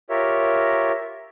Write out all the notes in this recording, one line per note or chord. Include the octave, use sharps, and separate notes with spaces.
F4 G4 A#4 C#5 E5